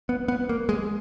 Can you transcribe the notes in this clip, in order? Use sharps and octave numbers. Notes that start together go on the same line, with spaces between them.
B3
B3
A#3
G#3